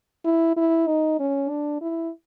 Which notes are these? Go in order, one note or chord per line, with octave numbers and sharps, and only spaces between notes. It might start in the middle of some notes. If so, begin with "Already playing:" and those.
E4
E4
D#4
C#4
D4
E4